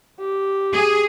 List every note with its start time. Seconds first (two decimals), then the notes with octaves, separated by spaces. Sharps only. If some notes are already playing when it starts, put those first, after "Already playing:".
0.20 G4
0.74 G#4